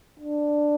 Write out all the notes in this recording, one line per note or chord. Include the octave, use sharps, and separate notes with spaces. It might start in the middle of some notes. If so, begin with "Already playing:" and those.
D4